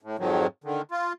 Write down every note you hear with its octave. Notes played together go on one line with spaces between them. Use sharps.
A2
F2 G#2 D#3 F3 F#3
D3 D#3
F4